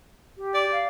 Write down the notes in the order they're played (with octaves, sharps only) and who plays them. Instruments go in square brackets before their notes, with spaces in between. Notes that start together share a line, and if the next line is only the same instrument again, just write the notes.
[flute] G4
[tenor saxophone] D5
[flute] F5